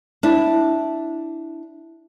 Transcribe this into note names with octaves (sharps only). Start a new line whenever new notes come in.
D4 E4